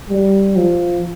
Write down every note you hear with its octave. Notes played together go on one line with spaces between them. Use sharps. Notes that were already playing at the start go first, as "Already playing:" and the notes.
G3
F3